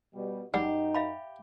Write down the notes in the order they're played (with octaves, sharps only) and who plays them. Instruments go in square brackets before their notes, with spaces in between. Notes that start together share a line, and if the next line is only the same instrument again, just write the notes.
[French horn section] B2 G3
[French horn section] F#2 D#4 [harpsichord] G3 [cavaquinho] G4 [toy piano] F#5
[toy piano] E5 F5 B5